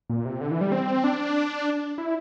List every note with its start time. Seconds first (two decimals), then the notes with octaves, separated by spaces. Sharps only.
0.10 A#2
0.25 C3
0.41 D3
0.51 E3
0.61 G3
0.72 C4
1.04 D4
1.98 E4